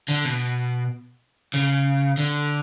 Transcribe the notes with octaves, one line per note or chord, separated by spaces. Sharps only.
D3
B2
C#3
D3